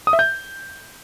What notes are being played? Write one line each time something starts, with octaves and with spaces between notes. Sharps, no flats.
D#6
E5
G6